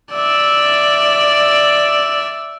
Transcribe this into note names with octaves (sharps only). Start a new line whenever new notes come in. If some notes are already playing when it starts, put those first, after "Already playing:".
D5 E5